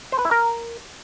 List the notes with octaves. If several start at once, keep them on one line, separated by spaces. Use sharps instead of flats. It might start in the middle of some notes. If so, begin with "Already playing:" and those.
C5
B4
E4
A#4